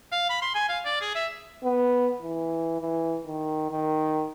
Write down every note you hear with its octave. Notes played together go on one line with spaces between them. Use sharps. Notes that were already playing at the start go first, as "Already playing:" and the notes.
F5
B5
C6
G#5
F5
D5
G#4
E5
B3
E3
E3
D#3
D#3